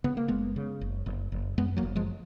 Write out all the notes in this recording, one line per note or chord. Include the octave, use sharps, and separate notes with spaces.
C#3 B3
A#3
F#1 G#3 B3
C#3
F#1
F#1
F#1
F#2 G#3 B3
F#3 A#3
F#1
F3 G#3